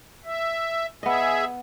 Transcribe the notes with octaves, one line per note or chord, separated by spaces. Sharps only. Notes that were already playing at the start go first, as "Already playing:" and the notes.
E5
B3 G#4 D#5 E5